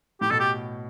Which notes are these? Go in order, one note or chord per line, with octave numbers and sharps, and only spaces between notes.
A2 G4
B2 A4
G4